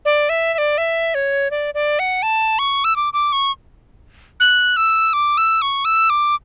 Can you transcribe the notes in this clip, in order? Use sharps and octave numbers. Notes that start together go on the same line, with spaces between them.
D5
E5
E5
D5
E5
C#5
D5
D5
F#5
A5
C#6
E6
D6
D6
C#6
F#6
E6
D6
E6
C#6
E6
D6